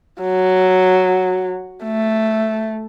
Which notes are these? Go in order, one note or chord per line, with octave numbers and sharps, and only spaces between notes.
F#3
A3